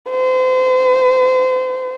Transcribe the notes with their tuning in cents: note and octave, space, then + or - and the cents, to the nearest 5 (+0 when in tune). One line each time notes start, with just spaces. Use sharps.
C5 -35